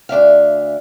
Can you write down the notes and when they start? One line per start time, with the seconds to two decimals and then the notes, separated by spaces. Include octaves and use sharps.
0.09 D2 D4 E5 F5